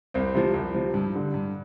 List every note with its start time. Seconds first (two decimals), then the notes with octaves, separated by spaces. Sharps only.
0.14 C2 C4
0.35 C3 F3
0.54 C2
0.75 C3 F3
0.94 G2
1.14 D3 G3
1.34 G2